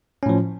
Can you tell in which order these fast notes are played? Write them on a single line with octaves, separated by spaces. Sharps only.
C#4 A2 F3